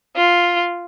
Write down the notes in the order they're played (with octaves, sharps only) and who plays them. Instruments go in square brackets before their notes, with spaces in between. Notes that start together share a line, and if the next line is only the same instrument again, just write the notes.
[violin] F4